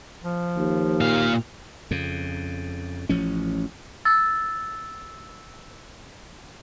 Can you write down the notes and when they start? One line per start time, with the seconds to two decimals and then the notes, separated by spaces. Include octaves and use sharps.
0.24 F3
0.57 D#2
1.01 A#2 F5
1.91 F2 C#3
3.09 A1 F3 C#4
4.05 E6 A6